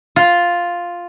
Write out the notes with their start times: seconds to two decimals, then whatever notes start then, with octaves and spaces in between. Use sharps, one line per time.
0.16 F4